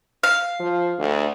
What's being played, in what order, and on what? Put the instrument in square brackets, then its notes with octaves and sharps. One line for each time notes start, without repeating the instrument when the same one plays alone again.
[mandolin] F5
[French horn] F3
D2